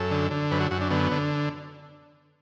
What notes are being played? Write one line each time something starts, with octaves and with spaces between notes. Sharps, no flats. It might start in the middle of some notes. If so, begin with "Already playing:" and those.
Already playing: F#2 A4
D3
D3
F#2 B4
F#4
F#2 F#4
D4
D3 B3
D3